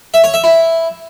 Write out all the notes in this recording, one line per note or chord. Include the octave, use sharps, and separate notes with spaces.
E5
C#5
E5
E4